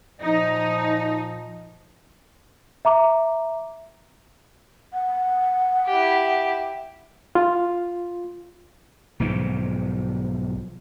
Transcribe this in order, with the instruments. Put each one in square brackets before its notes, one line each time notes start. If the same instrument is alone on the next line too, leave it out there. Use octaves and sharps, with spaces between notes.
[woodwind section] A#2 F3 [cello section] D#4
[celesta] E5 A#5 D6
[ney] F#5
[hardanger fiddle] E4 G4
[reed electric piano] F4
[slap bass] B1 G#2 D#3 F3